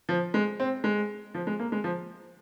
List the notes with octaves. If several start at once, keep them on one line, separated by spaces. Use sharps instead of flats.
F3
G#3
C4
G#3
F3
G#3
A#3
G#3
F3